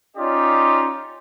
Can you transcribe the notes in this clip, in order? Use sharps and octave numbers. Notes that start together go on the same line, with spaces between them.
C#4 D#4 F4 G4 D5 D#5